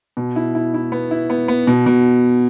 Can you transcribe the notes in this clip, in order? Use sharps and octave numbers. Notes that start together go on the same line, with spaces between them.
B2
E4
E4
E4
B3
E4
B3
B3
B2
B2